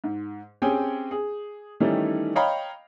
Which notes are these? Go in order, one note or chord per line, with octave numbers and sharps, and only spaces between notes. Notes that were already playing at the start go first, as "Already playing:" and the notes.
G#2
C4 C#4 G4 G#4 G5 G#5
G#4
D#3 E3 G3 A3 C#4 D#4
C#5 D#5 F5 G5 A#5 B5